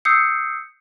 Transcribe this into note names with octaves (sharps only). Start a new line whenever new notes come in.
D#6 E6 G6 C7 C#7